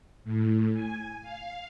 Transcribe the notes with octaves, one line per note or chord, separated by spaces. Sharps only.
A2
G#5
F5